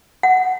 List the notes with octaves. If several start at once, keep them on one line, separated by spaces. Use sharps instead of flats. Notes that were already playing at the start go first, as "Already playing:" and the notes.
F#5